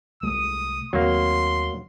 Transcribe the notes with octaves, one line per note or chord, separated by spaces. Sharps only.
C2 G#3 A3 D#6
D#2 F#3 A3 A#3 C4 C6